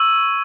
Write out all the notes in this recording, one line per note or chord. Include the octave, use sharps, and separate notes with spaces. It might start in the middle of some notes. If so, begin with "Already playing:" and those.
Already playing: C#6 E6 G#6 D#7 F#7